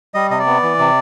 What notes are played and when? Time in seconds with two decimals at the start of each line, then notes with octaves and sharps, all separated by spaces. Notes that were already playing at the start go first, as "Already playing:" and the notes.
0.14 G3 D#5
0.31 C3 D#5
0.39 D5
0.47 B3
0.63 E3
0.79 C3